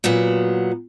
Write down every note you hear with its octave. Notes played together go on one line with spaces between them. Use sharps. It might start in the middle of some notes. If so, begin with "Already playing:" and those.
A#2 F#3 B3